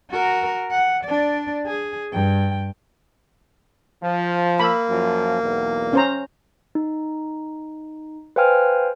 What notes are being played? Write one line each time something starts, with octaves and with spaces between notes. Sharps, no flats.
F#4 A#4
F#5
D4 D5
G#4
G2 G5
F3
A#3 B5 E6
F#2 F3
B1 E2
C#4 C5 A#5
D#4
B4 C5 F5 G5 G#5 F6